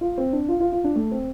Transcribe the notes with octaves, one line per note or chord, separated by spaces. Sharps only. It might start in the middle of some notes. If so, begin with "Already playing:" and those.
F4
C4
D4
F4
F4
F4
D4
A3
C4